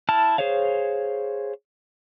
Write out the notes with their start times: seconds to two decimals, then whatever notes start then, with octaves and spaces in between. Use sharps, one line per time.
0.09 E4 A5 F6
0.38 G#4 C5 C#5 F5